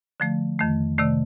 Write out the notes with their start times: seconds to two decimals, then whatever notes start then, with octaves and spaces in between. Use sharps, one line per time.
0.20 D3 F3 A3
0.59 F2 D#3 A3
0.98 C3 D#3 A3 D5